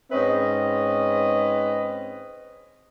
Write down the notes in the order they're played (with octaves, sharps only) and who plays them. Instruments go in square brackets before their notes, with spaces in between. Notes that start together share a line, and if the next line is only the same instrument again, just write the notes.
[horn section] G#2 C4 C#4 B4 D#5